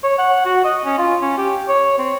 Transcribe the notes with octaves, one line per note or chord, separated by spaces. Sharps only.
C#5
F#5
F#4
D#5
C#4
F4
C#4
G4
C#5
C4